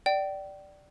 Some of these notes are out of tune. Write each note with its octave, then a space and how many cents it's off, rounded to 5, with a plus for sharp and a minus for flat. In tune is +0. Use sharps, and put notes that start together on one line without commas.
D5 +0 G5 -35